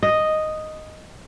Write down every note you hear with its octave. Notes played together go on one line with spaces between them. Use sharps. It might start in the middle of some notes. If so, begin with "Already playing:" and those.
D#5